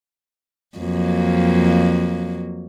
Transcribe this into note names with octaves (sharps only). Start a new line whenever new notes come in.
F2 F#3 A#3